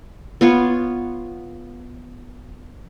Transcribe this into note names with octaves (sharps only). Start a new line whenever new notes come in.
B3 F4 C#5